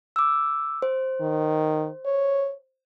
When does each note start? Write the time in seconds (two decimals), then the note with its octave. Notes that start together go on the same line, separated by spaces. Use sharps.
0.16 D6 E6
0.82 C5
1.21 D#3
2.05 C#5